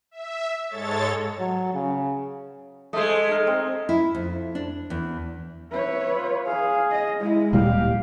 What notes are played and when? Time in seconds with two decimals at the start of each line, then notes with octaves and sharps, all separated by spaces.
0.11 E5
0.68 G#2 G#3 A4 C#5 A6
1.39 F#3
1.74 C#3
2.93 G#3 A3 C5 D#5
3.29 D#4 A#4
3.47 C4
3.89 E4
4.15 F2
4.55 D4
4.90 E2
5.71 B4 C#5 E5
6.16 F4
6.46 G#4 F5
6.91 D#5
7.20 G#3 E4
7.53 D1 A#2 G3 G4 F5